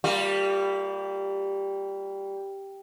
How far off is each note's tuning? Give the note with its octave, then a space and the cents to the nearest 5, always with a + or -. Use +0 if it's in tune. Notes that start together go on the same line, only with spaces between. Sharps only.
G3 +0 A#3 -30 F4 +20